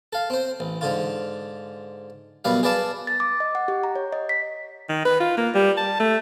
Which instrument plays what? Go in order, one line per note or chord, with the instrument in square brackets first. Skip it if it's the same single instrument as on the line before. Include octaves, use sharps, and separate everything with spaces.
[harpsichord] A4 F5
C4 C5
A1
G#2 D3 F4
F#2 B2 G3 B4 F5
G#4 B4 D5 F5 A5
[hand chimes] A6
D6
D#5
F#5
G4
A#5
C#5
D#5
B6
[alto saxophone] D#3
B4
F4
A#3
G3
A5
A3